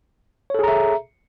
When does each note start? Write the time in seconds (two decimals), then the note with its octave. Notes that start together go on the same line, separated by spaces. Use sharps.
0.50 C#5
0.55 A4
0.59 G#4
0.63 A#5
0.68 E5